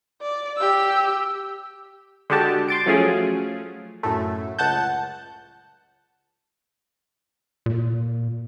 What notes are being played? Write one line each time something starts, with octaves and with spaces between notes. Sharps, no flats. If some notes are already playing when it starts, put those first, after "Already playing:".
D5
G4 E6
D3 G#3 F#4 G4 A5
C6 A6 D7
F3 F#3 A3 C#4 F4 G#4
F#2 A2 A3
C#2 F#5 A5 G6
A#2